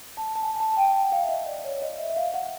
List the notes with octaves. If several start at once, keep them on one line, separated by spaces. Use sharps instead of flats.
A5
A5
G#5
A5
G5
F#5
F5
E5
D#5
D5
C#5
D#5
E5
E5
F5
F#5